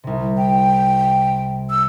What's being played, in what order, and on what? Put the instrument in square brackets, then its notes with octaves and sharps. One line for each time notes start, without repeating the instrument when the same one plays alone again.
[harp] C2 C3
[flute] G5
E6